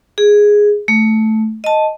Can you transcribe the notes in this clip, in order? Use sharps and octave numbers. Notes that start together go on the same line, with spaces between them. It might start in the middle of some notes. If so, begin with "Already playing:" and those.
G#4
A3
D#5 A5